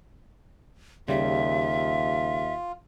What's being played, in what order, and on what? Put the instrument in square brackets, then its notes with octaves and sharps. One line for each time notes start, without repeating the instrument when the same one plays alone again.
[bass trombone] D#2 [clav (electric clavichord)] C#3 G3 [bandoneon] F4 [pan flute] E5